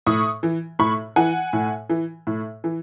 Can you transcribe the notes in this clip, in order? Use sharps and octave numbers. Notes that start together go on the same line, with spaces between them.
A2 C#6 D#6
E3
A2 B5 C#6
E3 F#5 G#5
A2
E3
A2
E3